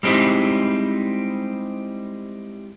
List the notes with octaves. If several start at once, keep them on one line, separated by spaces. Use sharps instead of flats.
G3 G#3 C4 D#4 E4